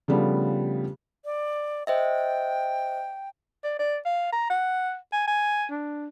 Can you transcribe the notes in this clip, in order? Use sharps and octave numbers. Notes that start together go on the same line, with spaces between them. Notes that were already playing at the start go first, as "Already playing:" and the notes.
C#3 F3 G3 A3 B3 D4
D5
C5 D#5 E5 G5
D5
D5
F5
A#5
F#5
G#5
G#5
D4